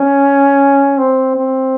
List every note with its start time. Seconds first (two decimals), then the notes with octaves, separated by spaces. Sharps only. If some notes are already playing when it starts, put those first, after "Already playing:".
Already playing: C#4
0.98 C4
1.36 C4